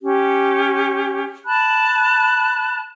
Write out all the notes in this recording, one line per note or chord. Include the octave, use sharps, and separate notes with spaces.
C#4 G4
A5 B5 F#6